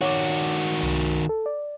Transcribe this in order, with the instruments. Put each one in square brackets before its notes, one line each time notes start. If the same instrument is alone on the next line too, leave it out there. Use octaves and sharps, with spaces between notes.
[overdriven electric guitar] D#3 F#4 [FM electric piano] C#5 D6
[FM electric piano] C2
A4
D5